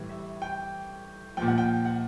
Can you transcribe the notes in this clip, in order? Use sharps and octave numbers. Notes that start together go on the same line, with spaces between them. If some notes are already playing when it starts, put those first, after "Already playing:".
Already playing: A2 E3 G3
E5
G5
A#2 F3 G5
F#5
G5
F#5